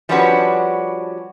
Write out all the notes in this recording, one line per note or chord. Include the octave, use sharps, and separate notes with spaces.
F3 G3 C#4 D4 F#4 B4